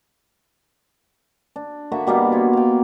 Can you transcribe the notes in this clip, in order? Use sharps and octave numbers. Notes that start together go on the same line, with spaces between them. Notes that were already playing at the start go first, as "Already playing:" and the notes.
D4
D3 A#3 F#4 E5
B2 G3 A#3 B3
F4 C#5
F5 G5